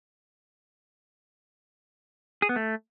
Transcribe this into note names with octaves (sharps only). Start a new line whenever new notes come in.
G#4
B3
A3